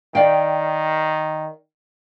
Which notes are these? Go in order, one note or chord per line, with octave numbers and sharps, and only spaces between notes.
D#3 D5 F5 G5